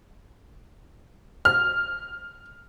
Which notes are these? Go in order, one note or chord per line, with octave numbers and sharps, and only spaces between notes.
F6